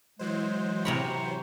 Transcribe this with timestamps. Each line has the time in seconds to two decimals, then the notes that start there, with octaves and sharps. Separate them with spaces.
0.19 E3 F#3 G#3 C5
0.85 C3 A#4 B5 C#6